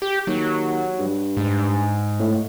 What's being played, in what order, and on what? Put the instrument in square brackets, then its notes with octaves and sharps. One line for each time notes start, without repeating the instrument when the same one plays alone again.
[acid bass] G4
[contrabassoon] D#2 [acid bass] F#3
[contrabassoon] G2
[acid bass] G#2
[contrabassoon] A2